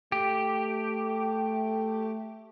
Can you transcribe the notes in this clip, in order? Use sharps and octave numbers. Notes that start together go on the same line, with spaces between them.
A3 G4